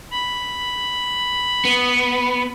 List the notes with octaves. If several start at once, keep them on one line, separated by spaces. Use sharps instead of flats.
B5
B3